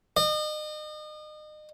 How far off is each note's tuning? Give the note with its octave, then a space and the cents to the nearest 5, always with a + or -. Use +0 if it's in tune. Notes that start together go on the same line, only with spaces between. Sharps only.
D#5 -35